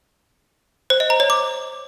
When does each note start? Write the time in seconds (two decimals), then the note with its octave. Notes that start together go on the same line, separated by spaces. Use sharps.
0.90 C5
1.00 D#5
1.10 A#5
1.20 C#5
1.30 D6